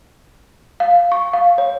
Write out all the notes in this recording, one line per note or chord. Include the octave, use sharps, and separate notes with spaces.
F5
C#6
F5
C#5